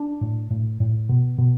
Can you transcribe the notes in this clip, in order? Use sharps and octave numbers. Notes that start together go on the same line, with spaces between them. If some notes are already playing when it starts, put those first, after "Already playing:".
Already playing: D4
A2
A2
A2
B2
B2